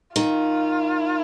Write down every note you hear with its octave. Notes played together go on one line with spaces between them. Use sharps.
D#3 F4